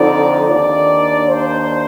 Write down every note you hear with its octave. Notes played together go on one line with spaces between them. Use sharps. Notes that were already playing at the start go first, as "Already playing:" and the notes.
Already playing: F2 D3 F3 C4 D#4 D5
D#2 D#3 A#3 D4 D5
C5